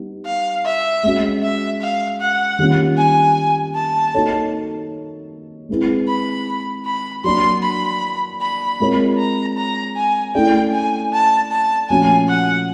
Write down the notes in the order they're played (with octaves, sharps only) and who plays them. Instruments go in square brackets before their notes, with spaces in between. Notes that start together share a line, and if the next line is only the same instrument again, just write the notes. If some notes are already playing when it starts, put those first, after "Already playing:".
Already playing: [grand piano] G3 B3 D#4
[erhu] F5
E5
[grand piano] G#3 C#4 F#4
[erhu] E5
F5
F#5
[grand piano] D#3 G3 A#3 C#4 F4
[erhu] G#5
A5
[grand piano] A#3 D#4 F#4 A4 C#5
G#3 C4 E4 G#4 B4
[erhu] B5
B5
[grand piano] F#3 A#3 D4 [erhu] C6
[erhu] B5
B5
[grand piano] G#3 C4 F4 A#4 C#5
[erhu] A#5
A#5
G#5
[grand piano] A3 C#4 E4 A4 D5 [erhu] G5
[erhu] G#5
A5
A5
[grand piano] A#2 F3 A3 C#4 F#4 [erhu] G#5
[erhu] F#5